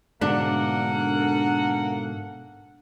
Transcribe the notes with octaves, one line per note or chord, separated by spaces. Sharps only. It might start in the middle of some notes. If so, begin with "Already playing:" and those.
G#2 B2 D3 A#3 D4 A4 F#5